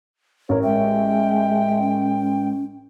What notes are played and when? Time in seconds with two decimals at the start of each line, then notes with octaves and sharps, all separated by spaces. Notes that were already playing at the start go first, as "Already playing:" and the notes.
0.49 A1 A#4 C#5
0.63 G#3 E5 G5
1.82 C#4